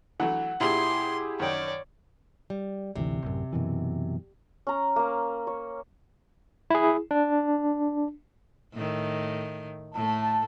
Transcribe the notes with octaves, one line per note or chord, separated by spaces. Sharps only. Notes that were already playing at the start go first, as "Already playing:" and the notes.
E3 F#3 A3 F#5
A#2 E4 G4 G#4 C6
F#2 D#3 C#5 D5 G5
G3
G#1 D2 C3 E3
A1 F#2
F#2 B2 E3
C#4 A#5
A#3 F5
C#5
E4 G#4
D4
A2 D#3
A2 A3 A5